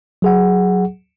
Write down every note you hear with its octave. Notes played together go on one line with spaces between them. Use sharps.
F#3 G#4 F#5